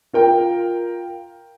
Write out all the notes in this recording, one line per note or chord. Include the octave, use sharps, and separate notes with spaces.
F4 A#4 G5